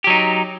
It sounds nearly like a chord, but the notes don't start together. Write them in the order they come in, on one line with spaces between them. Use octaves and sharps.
G4 F#3 D#4